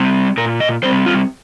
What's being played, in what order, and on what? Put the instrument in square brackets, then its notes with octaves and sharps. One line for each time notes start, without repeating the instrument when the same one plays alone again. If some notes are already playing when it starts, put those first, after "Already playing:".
Already playing: [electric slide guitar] G3 C4
A#2 A#4
D#5
G3 C4 C5
F4